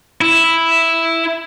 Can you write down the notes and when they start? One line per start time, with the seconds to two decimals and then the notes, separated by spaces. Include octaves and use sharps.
0.21 E4